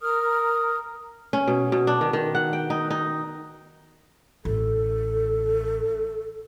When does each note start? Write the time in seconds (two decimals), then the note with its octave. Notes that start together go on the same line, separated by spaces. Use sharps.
0.01 A#4 D#6 F6
1.33 C#4
1.48 B2
1.72 B2
1.87 D4
2.01 D#3
2.13 D#3
2.35 F#5
2.53 G5
2.70 D#4
2.90 D#4
4.45 A1 A4